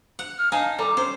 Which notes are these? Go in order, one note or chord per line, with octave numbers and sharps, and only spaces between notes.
F#5
F6
D#4 F5 G#5 A5
G3 A4 D5 A#5 D6
C#4 C5